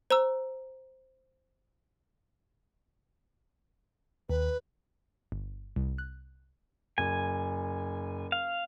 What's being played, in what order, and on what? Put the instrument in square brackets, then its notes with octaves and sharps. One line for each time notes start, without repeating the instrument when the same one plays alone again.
[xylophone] C5 A#5 E6
[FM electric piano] D#2 [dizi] B4
[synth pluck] G1
C2
F#6
[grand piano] F#1 [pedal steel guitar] G#5
[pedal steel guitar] F5